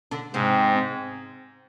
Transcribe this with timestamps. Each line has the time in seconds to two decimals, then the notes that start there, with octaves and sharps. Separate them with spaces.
0.11 D3 D4
0.34 G#2 C3 C4